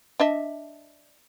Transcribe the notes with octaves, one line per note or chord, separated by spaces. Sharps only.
D4 D#5 E5